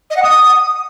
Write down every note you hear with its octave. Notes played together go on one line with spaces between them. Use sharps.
D#5
F#5
D#6